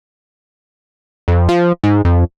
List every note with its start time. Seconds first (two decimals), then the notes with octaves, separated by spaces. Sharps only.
1.28 F2
1.49 F3
1.83 G#2
2.05 F2